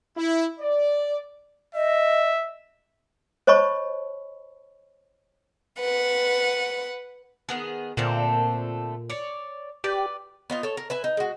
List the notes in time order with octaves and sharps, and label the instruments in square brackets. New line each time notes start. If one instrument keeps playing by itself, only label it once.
[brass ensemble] E4
D5
[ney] D#5 [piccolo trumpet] E5
[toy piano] C5 C#5 D#5 A5 B5 C#6
[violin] B4 F#5
[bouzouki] D#3 B3 G#4
[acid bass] A#2 [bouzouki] D3 A3 C4
[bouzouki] C#5 D5
[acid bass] G4 [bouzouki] B4 D5
[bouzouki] B3 D#4 F4
A4 C#5
A#4
B4 E5 G#5
D#4
G#3 F#4